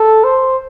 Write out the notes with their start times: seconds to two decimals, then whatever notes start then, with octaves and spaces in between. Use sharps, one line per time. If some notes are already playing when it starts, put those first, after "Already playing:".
Already playing: A4
0.24 C5